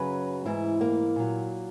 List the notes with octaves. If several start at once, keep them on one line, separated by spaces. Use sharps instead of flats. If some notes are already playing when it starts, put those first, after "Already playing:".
Already playing: F#2 C#3 F#3 B4
G#2 E3 E4
A#3
A#2 F#3